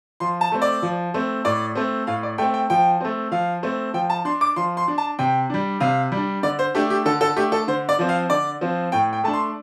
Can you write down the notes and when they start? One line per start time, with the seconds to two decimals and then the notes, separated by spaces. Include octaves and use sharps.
0.20 F3 C6
0.41 A5
0.52 A3 C4
0.62 D5
0.82 F3
1.14 A3 C4
1.45 A2 D5
1.75 A3 C4
2.07 A2 F5
2.23 D5
2.38 A3 C4 G5
2.54 G5
2.70 F3 G5
3.01 A3 C4
3.31 F3 F5
3.63 A3 C4
3.94 F3 G5
4.10 A5
4.25 D4 C6
4.41 D6
4.56 F3 C6
4.77 C6
4.88 D4
4.98 A5
5.19 C3 G5
5.50 G3 D4
5.80 C3 F5
6.12 G3
6.17 D4
6.43 D3 D5
6.59 C5
6.75 A3 D4 G4
6.90 G4
7.05 D3 A4
7.21 A4
7.36 A3 D4 G4
7.52 A4
7.68 D3 C5
7.89 D5
7.99 F3 C4
8.09 F5
8.30 D3 D5
8.61 F3 C4
8.92 A2 G5
9.13 G5
9.24 A3 D4 A5
9.33 C6